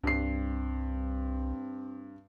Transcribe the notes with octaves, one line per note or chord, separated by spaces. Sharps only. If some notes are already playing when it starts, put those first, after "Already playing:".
C2 G2 C4 C7